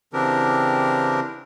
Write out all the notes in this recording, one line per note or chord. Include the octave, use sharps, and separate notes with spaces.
C#3 E3 C4 D4 G4 A#4